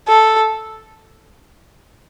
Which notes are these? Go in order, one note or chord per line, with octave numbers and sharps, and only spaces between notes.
A4